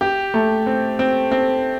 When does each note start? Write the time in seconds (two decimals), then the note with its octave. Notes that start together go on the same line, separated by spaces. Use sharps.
0.01 G4
0.34 A3
0.67 C4
0.99 C4
1.32 C4